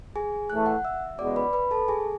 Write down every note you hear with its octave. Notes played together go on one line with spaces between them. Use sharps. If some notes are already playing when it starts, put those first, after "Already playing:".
G#4 G#5
A2 E3 A3 F#6
F#5 F#6
E5 E6
E2 C#3 G#3 B3 F#4 D5 D6
B4 B5
B4 B5
A4 A5
G#4 G#5